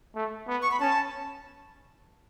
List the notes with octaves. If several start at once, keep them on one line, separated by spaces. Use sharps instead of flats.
A3
B3
C#6
B5
C#4 A5